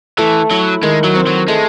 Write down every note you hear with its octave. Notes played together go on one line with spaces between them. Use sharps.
E3 A3
F#3 E4
D#3 G#3
F#3
C4
F#3
G#3 A3